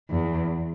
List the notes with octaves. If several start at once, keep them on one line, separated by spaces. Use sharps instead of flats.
E2